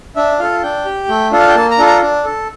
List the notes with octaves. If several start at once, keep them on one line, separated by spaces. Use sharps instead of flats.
D4 E5
F4 A4 F5
D4 G5
G4
A3
D4 F4 A4
F5
G5
A#3 A5
A#5
D4 F4 A4
A#5
D4
A4